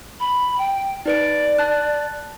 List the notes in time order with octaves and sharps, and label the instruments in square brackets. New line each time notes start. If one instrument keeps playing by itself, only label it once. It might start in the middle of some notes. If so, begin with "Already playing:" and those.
[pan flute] B5
G5
[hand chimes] D#4 B4 D7 [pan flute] D5
[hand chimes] A5 F#6